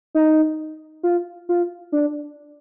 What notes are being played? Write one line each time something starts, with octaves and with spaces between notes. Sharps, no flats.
D#4
F4
F4
D4